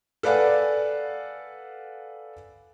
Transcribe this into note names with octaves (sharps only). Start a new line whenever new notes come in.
A4 B4 D5 F5 F#5 G#5